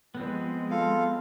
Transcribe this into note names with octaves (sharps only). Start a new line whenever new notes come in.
F3 G#3 B3 C4
F4 A4 F5